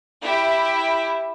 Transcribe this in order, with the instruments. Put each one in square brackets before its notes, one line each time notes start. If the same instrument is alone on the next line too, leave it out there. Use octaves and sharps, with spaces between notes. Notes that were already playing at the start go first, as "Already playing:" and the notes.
[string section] E4 G4